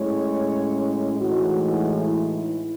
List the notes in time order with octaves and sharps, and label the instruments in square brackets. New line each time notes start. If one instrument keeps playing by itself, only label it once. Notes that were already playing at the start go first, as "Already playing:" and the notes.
Already playing: [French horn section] A2 G#3 C#4 C#5
A2 E3 G#3 D#4 F#4
E4